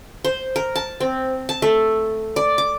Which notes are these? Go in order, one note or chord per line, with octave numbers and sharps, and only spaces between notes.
C5
A#4
A5
C4
A5
A3
D5
D6